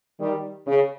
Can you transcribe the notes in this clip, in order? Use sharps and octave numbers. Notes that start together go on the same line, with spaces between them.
D#3 G3
C#3